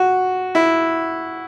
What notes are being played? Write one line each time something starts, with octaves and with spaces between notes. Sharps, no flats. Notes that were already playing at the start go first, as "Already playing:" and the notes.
Already playing: F#4
E4